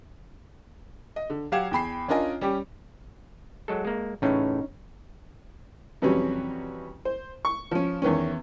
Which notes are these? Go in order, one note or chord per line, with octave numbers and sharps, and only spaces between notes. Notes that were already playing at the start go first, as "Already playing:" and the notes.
D#5
D3
F#3 G4 F5 F#5 G#6 E7
E2 G5 B5 C7
C#4 D4 F4 A#4 D#5 G#5
G3 C#4 G4
F#3 G#3 A4
G#3 A#3
A2 C#3 E3 C#4 D#4
F2 C3 E3 F#3 G3 C#4
C5
C#6
F3 C#4
E2 D#3 B3 C#4